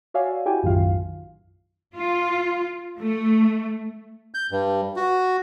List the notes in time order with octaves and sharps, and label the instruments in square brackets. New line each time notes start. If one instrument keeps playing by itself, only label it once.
[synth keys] F#4 C#5 D5 E5 F5 G#5
E4 F#4 G4 G5 G#5
B1 F#2 A2 D#3 F4 F5
[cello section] F4
A3
[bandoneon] G6
G2
F#4